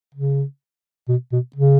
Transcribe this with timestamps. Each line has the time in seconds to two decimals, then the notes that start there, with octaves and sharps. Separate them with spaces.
0.15 C#3
1.08 B2
1.32 B2
1.56 C#3